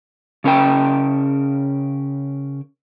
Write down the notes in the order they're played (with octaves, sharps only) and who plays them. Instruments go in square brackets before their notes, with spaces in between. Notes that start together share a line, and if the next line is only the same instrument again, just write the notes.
[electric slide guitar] C#3 C#4 A#4 G5